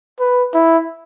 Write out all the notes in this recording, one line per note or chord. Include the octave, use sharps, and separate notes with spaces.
B4
E4